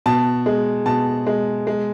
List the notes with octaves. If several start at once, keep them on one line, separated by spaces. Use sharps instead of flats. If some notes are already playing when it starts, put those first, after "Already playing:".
B2 A5
G#3
B2 A5
G#3
G#3